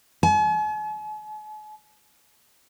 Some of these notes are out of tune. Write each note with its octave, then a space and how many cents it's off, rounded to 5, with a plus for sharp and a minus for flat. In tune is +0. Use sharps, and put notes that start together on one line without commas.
G#5 +45